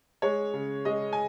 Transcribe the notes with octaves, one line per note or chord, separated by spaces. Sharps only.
G#3 C#5
C#3
G#3 D#5
G#5